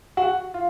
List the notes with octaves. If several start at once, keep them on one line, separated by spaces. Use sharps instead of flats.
F#4 F#5
F4